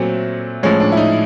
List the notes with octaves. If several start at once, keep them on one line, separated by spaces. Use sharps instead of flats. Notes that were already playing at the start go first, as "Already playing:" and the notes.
Already playing: A#2 F#3 A3 C4
A2 F3 G#3 C#4
D4
E4
D#4